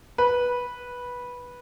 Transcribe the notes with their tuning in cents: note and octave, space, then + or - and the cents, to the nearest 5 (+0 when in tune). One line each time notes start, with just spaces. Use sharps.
B4 -10